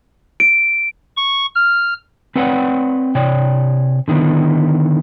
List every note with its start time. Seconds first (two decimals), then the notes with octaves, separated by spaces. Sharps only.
0.40 D7
1.17 C#6
1.55 F6
2.36 C4 B4 C#5 D5 F#5 G5
3.15 C3 C#5 D5 G5
4.08 D3 D#3 B3 E4